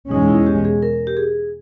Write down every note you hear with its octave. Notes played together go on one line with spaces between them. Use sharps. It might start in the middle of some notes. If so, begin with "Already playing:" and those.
E2 B2 G#3 C#4 D#4
D#4
E4
G4
G#4
A#4
G4
G#4